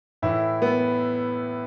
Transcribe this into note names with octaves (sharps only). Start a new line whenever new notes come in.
A2 E3 E4
B3